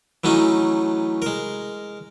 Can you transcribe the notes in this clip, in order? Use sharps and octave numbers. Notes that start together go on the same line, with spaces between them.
E3 F#3 A3 C#4 D#4
G#3 A#4